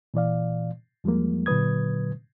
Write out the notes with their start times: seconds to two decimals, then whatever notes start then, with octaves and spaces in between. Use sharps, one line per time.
0.14 A#2 E3 D5 F5
1.04 E2 F3 G3 G#3 A#3
1.46 A#2 D3 F#3 B4 D#6 G#6